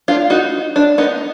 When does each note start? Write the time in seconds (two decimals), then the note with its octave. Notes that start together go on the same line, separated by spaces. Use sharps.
0.08 D4 F4
0.30 D#4 F#4
0.76 D4
0.98 B3 D#4